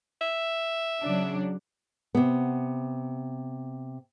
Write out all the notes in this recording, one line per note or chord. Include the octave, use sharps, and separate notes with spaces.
E5
C#3 F#3 D4
C3 B3